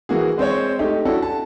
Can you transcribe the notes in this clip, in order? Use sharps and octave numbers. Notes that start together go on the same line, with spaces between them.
E3 A#3 F#4 G#4
G#3 C4 C5 C#5
A3 D#4 G4
C#4 D4 E4 F#4 A4
A5